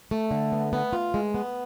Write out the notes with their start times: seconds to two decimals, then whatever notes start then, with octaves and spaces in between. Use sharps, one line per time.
0.11 A3
0.31 D3
0.52 B3
0.73 B3
0.93 F4
1.14 G#3
1.34 B3